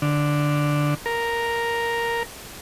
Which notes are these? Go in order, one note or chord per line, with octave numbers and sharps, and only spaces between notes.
D3
A#4